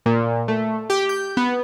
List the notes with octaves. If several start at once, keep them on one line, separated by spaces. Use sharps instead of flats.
A#2
A3
G4
G6
B3